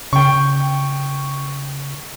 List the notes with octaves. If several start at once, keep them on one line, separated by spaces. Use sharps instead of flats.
C#3 G5 C#6